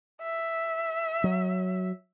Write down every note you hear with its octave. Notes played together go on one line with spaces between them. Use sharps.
E5
F#3